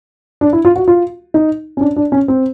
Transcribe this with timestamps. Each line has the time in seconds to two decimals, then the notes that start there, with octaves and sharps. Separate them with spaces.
0.41 D4
0.53 E4
0.65 F4
0.76 F#4
0.88 F4
1.34 D#4
1.77 C#4
1.81 D4
1.96 D4
2.12 C#4
2.28 C4